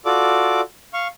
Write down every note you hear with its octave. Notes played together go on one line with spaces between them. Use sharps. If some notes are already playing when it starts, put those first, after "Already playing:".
F4 F#4 A4 D5 D6
F5 C#6